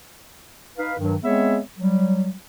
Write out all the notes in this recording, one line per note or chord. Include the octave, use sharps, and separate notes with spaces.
D#4 B4 F5
G2 D#3 F#3
G#3 B3 C4 G#4 C#5 E5
F#3 G3